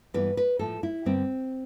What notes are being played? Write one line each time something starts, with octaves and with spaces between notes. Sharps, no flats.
G2 E3 G3 B3 B4
B4
A2 F3 A3 A4
E4
G2 D3 G3 B3 C4